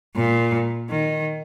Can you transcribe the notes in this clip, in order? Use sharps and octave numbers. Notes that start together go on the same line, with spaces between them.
A#2
D#3